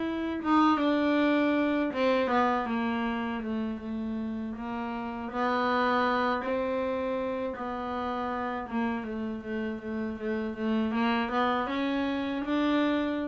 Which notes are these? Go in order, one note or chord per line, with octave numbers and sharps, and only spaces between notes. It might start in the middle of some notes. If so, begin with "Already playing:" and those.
Already playing: E4
D#4
D4
C4
B3
A#3
A3
A3
A#3
B3
C4
B3
A#3
A3
A3
A3
A3
A3
A#3
B3
C#4
D4